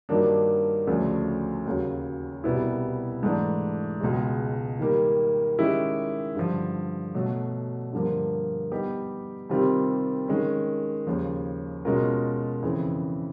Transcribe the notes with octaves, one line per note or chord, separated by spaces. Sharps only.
G2 D#3 F#3 A#3 D4
D2 C#3 F3 A3 D4
D#2 C#3 F#3
C2 B2 G3 B3 E4
G#2 E3 A3 D4
C#2 B2 G#3
D#3 G3 A#3
D#3 G#3 C#4 E4 G4
G2 D3 F3
B2 F#3 A3
G2 D3 F3 A#3
G3 B3 D#4 G4
C3 D#3 G3 C4 F4
D#3 G#3 C#4
D#2 C#3 F3
B2 G#3 C#4 F4 A#4
F2 C#3 E3